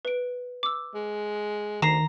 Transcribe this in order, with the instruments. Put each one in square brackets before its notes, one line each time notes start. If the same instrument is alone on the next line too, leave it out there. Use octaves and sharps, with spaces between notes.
[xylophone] B4 D7
D6 E6
[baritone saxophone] G#3
[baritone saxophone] D2 [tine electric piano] D#3 [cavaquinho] A#5 [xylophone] C7 E7